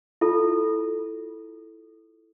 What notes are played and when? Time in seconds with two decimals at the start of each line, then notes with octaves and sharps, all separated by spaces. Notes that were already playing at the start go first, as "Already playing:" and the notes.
0.21 E4 F4 A4